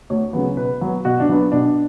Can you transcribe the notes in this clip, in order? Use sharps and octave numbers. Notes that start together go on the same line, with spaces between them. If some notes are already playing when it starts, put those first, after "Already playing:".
D2 C#5
C#3 F#3 B3
B2 B4
F#3 B3
B2 F#4
D4
F#3 B3
B2 D4